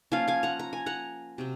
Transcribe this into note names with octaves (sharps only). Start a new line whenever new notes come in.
F3 A#3 C#4 F4 F5 G#5
F5 G#5
F#5 A#5
A#5
G#5
F#5 A#5
C3 F#3 C4